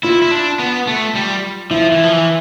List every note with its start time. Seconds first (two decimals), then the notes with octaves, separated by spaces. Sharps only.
0.03 E4 F4
0.22 E4
0.31 D4
0.59 B3
0.87 A3
1.15 G3
1.71 F3 E4
1.92 E3
2.03 F3
2.13 E3